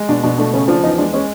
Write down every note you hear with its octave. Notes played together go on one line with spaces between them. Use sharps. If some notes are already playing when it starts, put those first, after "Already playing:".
Already playing: G#3
B2 D4
B2 D4
A3 D4
C#3 C#4
F3 D4
E2 D#4
G#3 D4
G#3 C#4